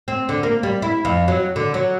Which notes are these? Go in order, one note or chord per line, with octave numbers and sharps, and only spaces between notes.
C4
D3
A#3
G3
E4
F2
F#3
D3
F#3